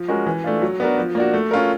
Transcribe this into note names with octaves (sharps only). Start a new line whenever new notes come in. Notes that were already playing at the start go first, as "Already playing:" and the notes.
Already playing: F3
G#3 C#4 F#4 A#4
E3
A3 D4 F4
F#3
B3 D4 F#4 A#4
F3
A#3 D4 F#4
A3
C#4 F4 A#4